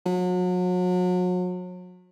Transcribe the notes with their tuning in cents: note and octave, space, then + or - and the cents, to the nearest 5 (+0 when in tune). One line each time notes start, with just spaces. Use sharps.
F#3 -35